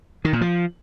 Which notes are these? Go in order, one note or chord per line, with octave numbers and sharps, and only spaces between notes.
D#3
A#2
F3